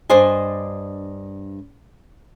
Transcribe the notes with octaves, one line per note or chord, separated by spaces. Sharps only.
G2 D4 C5 D#5 G#5